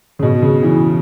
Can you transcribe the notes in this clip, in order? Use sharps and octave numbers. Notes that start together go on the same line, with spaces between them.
C#3
B2
C#3
E3